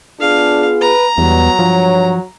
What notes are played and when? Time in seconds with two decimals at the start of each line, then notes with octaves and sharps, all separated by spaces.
0.20 B3 D4 F4 G#4 F5
0.81 B4 A#5
1.18 E2 F#3 G3 B3
1.59 G2 F3 C#5